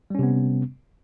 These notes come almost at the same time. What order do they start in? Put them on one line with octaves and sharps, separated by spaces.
G3 C#4 C3 B3